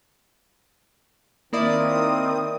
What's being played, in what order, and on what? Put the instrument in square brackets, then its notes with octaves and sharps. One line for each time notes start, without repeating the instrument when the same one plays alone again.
[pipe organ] D#3 C4 [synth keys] A#3 E4 D5 [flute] A#4 [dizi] D#6